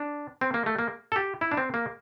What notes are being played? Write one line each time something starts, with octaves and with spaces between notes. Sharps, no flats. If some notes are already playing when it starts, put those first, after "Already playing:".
Already playing: D4
C4
A#3
A3
A#3
A4
G4
E4
D4
C4
A#3